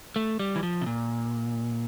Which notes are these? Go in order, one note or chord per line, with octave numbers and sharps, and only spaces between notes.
A3
G3
E3
F3
C3
A#2